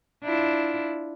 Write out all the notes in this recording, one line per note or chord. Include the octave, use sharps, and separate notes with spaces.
D4 E4 F4